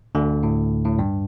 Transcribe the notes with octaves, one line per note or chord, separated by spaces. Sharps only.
D2 D3
A2
A2
G2